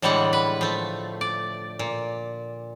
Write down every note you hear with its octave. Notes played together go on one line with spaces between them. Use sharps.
A2 D3 E3 G3 G#3 F#5
B4
F3 A3
D5
A#2